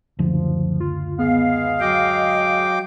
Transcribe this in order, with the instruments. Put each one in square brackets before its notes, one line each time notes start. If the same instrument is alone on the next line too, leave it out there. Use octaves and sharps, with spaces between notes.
[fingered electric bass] F#1 D2 [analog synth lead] F3
[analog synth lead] F4
[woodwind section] G#3 G#4 F5 [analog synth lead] B3
[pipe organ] F#3 G5 D6 [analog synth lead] D#5